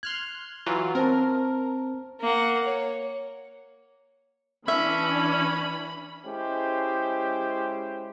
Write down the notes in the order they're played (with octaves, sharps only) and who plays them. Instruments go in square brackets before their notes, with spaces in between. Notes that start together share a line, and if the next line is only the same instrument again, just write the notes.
[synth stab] C6 F6 F#6 [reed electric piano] G#6
[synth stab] E3 F#3 F4
[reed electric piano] C4 C5 A5 [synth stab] A#4
[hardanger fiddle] A#3 F#5
C#5
[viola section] E3 D4 [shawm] C#4 [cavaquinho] E5 [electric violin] B5
[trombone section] G#3 C#4 E4 G4 C5